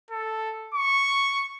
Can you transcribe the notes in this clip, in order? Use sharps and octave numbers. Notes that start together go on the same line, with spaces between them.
A4
C#6